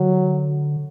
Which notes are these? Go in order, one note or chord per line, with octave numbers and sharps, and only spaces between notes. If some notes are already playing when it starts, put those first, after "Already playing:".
Already playing: D3 F#3